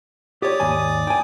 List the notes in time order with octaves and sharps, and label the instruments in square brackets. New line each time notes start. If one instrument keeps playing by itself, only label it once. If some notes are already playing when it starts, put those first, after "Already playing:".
[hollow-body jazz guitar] G4 C#5 [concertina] D5 D6 D#6
[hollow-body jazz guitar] D#2 G#2 G#5
G5 G#5